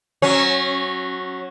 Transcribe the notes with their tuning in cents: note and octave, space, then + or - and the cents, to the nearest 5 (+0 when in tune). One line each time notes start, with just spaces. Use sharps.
F#3 +0 C#4 -20